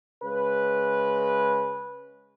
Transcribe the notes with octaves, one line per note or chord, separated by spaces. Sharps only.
C#3 G#3 B4